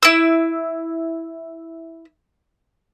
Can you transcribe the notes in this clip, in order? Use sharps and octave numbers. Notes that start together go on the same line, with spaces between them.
E4 E6